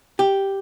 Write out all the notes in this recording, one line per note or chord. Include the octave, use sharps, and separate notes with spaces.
G4